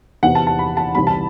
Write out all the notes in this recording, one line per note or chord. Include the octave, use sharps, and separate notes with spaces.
E2 C3 E3 F#5
A5
A5
B5
A5
C2 C3 E3 B5
A5